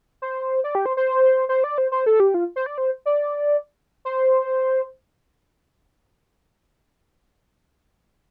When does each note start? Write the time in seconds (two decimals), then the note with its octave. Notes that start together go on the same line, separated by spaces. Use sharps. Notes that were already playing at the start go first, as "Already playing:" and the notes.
0.22 C5
0.64 D5
0.75 G4
0.86 C5
0.97 C5
1.49 C5
1.64 D5
1.78 C5
1.92 C5
2.06 A4
2.20 G4
2.34 F4
2.56 C5
2.66 D5
2.78 C5
3.06 D5
4.05 C5